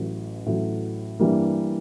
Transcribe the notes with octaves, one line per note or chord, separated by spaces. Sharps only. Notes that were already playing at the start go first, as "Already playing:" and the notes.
Already playing: A1 A2 F#3
A1 A2 F#3
G2 E3 G3 A#3